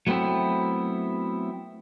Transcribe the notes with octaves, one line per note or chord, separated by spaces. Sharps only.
F#3 A3 B3 C4 E4